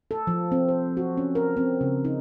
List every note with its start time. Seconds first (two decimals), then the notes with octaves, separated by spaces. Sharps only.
0.11 A4
0.27 F3
0.52 C4
0.69 C5
0.97 F#4
1.17 C#4
1.35 A#4
1.57 C4
1.81 C#3
2.05 D#4